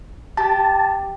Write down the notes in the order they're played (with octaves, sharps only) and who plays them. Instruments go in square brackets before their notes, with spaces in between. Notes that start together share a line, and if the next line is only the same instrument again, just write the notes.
[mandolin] G4 [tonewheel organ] A5